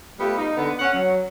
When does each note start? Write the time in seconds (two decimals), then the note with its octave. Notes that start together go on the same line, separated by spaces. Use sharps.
0.19 G3 A3 B3 F4
0.37 D#4
0.56 D3 B3
0.79 C#4 F#5
0.93 F#3